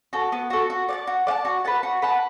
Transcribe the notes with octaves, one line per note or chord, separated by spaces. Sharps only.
F#4 A4
B3
F#4 A4
F#4
D5 F#5 A5
F#4
D5 F#5 A5
F#4
B4 F#5 A5
F#4
B4 F#5 A5